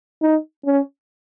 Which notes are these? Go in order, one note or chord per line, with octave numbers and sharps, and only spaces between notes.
D#4
C#4